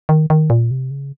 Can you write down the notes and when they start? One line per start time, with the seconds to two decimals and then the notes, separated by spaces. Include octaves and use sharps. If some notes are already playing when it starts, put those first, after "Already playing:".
0.09 D#3
0.30 D#3
0.50 A#2
0.71 C3
0.91 C#3